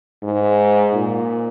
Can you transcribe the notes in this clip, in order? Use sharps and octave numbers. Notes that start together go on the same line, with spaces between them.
G#2
A#2